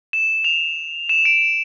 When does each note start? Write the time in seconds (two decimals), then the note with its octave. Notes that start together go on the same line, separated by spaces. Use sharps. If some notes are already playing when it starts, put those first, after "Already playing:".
0.13 E7
0.44 F7
1.09 E7
1.25 D7